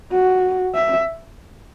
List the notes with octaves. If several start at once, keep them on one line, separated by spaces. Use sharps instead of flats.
F#4
E5